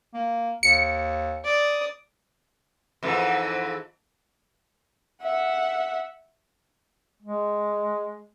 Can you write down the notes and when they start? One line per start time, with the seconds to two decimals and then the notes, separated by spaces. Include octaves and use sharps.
0.14 A#3
0.63 D#2 C#7
1.45 D5 D#6
3.03 F2 G#2 E3
5.22 E5 F#5
7.22 G#3